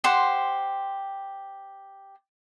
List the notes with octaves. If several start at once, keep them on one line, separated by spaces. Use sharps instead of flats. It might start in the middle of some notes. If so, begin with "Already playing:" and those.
G4 C5 F#5 C6